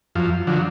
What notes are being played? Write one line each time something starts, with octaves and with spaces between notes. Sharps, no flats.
F#2 F3
D3 F3 F#3